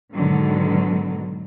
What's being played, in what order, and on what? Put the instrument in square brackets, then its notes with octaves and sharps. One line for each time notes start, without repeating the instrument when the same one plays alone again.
[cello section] G#2 B2 D3 D#3 F#3